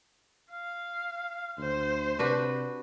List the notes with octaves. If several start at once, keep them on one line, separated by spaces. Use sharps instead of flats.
F5
D2 C5
C3 D4 F#4 B4